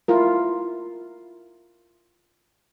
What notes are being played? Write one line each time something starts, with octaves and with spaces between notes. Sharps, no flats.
E4 F4 A#4